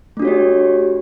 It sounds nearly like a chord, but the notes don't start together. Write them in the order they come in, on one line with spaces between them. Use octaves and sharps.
A3 D4 F#4 C#5 G4